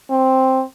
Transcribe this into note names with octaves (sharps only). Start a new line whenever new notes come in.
C4